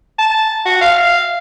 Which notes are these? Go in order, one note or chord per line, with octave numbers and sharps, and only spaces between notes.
A5
F#4
F5